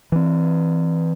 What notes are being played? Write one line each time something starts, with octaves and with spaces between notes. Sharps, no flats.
E3 C4